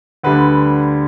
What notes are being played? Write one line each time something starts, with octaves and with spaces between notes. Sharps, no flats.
D2 D3 G3 B4